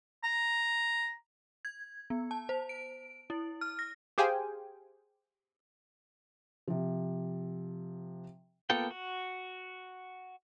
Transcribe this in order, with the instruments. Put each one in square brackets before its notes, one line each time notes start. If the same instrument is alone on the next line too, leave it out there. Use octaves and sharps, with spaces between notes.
[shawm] A#5
[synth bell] G#6
B3
A5
C5
D7
E4
F6
A#6
[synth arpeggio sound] G4 G#4 C5 F5 G5 G#5
[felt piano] C3 F3
[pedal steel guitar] A#3 B3 F4 A4 G5
F#4